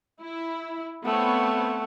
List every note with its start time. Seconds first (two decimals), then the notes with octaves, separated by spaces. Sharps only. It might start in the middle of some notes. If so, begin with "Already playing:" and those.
0.21 E4
1.05 A3 B3 C4 C#5 F#5